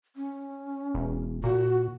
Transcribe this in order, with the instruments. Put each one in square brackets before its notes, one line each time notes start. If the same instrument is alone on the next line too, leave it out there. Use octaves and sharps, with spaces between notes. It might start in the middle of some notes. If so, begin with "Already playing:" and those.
[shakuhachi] C#4
[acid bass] E1
[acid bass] A#2 [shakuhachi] F#4